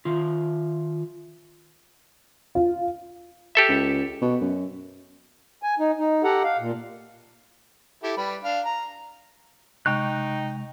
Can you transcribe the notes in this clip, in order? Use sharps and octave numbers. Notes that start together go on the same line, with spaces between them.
D#3 F4
F4
G4 A4 E5
C#2
B2
F#2
G#5
D#4
D#4
G4 A4 F#5 A#5
F5
A#2
E4 G4 A4
G3 B4 B5
D4 F5
A#5
C3 G#3 D#4 G5 C#6 F#6